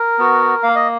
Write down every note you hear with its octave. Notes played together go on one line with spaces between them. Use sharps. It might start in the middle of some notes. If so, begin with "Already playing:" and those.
Already playing: A#4
B3 F#4
A#3 F5
D#5